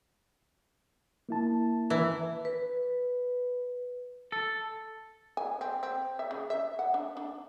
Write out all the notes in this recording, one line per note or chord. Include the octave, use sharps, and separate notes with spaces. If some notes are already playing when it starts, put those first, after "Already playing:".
A#3 E4 A5
E3
B4
A4
G#5
C4
C4
E5
C#3
E5
F#5
D4
D4